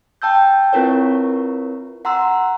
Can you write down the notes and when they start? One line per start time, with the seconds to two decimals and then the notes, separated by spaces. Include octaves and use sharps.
0.22 G5 A5 E6 G6
0.73 C4 E4 F4 A#4 B4 C#5
2.05 F#5 A#5 C6 E6